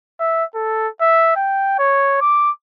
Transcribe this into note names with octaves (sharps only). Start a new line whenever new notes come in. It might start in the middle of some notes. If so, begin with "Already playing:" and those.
E5
A4
E5
G5
C#5
D6